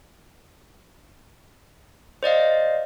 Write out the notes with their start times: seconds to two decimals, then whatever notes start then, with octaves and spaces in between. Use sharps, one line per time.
2.23 C5 D5 D#5 F5